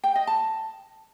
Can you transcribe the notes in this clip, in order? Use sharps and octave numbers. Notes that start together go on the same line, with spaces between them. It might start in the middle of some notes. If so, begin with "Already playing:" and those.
G5
D#5
A5